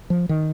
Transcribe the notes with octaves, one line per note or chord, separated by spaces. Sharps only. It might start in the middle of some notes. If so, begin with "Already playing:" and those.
F3
D#3